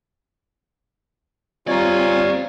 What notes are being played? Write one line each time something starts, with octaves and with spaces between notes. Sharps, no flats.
G3 C4 F4 C#5 D5 G#5 A#5